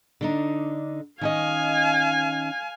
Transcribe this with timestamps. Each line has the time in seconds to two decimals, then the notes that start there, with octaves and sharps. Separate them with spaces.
0.21 D3 D4 D#4
1.21 D#3 C#4 D#5 F5 G#5